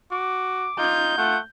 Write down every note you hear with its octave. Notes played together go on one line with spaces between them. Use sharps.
F#4 D6
D#4 F4 G6
A3 F4 F#5